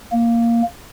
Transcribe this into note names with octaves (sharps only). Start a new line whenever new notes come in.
A#3